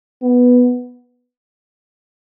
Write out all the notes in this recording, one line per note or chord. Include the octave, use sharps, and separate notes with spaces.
B3